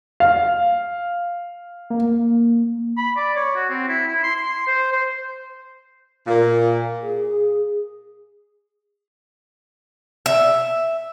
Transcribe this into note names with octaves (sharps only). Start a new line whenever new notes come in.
F5
A#3
B5
D5
C#5
F#4
C4
E4
E4
C6
C6
C5
C5
A#2
G#4
E5